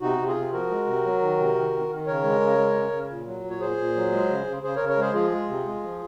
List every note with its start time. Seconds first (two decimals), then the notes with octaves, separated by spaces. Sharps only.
0.01 C3 D#4 F#4
0.18 C3
0.27 F4 G#4
0.36 C3
0.52 F3 F#4 A#4
0.70 G#3
0.86 C3
1.05 F#3
1.21 D#3
1.39 C3
1.55 D#3
1.72 D#3
1.90 D#3
2.07 C#3 A#4 C#5
2.23 G#3
2.41 C#3
2.58 G#3
2.75 C#3
2.92 C#3
3.09 A#2
3.26 F#3
3.44 A#2
3.50 C#5
3.60 A#2 G#4 C5
3.77 A#2
3.95 F#3
4.12 G#3
4.29 C#3
4.47 C#3
4.63 C#3 G#4 C5
4.76 A#4 C#5
4.80 C#3
4.89 A#4 C#5
4.97 G#3 G#4 C5
5.14 F3 F4 G#4
5.32 G#3
5.49 C3
5.66 G#3
5.83 F3